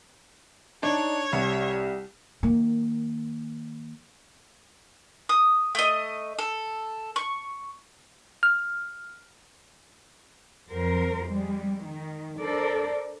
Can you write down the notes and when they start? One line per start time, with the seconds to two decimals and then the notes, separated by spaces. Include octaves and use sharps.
0.83 D4 D#4 C#5
1.33 C2 G3
2.43 D#3 A#3
5.29 D#6
5.75 A3 D#5
6.39 A4
7.16 C#6
8.43 F6
10.69 F2 F#3 A#4 C5
11.28 G3 G#3
11.83 D#3
12.39 D4 A4 A#4 C5 D5